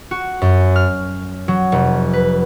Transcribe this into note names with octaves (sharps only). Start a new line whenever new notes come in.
F#4
F#2
F6
F#3
F1
B4